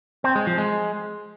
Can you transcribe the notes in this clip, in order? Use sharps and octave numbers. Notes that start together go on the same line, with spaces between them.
C4
G#3
F3
G#3